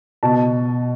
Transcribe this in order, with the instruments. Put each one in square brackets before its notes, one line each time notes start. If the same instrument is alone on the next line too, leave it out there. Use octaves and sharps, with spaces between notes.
[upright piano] B2 A5